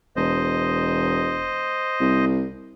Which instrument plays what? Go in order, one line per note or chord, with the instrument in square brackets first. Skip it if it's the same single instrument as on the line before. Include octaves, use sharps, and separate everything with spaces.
[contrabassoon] E1 [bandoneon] C5 D#5
[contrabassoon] C2